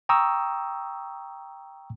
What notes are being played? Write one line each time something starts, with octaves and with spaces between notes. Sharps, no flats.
G5 A#5 C#6 D#6 E6